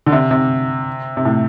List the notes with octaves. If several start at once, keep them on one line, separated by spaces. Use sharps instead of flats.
D3
C3
C3
C3
A2